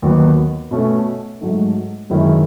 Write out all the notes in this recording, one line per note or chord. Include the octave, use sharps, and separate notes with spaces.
D#2 D#3 F#3 B3
B2 A3 C#4
G#2 F#3 A3 D#4
F#2 D#3 G#3 C#4 E4